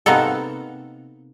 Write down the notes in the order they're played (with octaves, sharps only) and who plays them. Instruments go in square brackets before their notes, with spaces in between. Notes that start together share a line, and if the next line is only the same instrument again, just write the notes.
[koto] C3 A#3 B3 D#4 A4